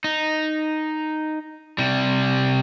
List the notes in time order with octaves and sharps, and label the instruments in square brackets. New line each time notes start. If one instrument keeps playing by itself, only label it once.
[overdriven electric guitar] D#4
C3 G3